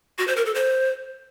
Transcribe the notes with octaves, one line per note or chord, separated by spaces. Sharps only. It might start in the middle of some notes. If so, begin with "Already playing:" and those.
F#4
C5
A#4
A4
C5